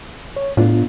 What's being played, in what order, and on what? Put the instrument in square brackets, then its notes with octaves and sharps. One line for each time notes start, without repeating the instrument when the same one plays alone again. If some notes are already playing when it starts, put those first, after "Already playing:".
[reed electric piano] C#5
[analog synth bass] A2 [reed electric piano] B3 D4 F4